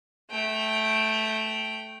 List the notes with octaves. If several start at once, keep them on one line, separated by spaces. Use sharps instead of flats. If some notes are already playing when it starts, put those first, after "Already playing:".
A3 G5